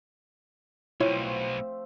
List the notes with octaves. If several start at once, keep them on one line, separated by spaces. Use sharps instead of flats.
B1 B2 F3 A3 C4 E4 F4 C#5